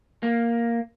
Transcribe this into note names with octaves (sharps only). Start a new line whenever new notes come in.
A#3